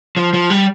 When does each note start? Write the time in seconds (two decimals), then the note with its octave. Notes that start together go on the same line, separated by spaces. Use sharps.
0.17 F3
0.33 F3
0.50 G3